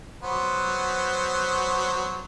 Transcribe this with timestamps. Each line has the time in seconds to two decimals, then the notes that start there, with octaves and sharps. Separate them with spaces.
0.23 F#3 B3 C5